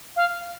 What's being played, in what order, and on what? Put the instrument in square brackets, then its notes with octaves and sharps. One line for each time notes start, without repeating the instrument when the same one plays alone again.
[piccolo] F5